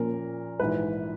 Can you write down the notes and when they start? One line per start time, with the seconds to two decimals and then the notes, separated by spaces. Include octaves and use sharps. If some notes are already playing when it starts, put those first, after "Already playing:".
Already playing: A#2 F3 A#3 C#4 F4 A#4
0.59 A#1 G#2 E3 B4